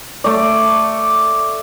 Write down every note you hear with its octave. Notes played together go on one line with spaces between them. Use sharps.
A3 D5